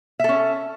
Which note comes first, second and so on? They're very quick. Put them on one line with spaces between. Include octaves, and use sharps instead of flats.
E5 A4 C#4